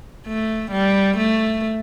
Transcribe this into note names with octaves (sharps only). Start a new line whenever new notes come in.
A3
G3
A3